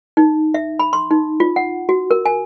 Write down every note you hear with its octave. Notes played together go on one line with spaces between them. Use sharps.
D#4
E5
B5
C6
D#4
F4
F#5
F#4
A#4
G#5